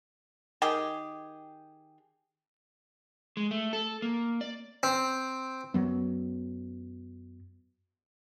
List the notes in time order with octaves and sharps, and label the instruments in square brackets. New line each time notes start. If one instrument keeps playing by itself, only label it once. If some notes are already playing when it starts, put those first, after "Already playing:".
[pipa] D#3 G4 G#4
[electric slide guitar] G#3
A3
A4
A#3
D5
[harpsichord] C4
[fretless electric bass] F#2 F#3 B3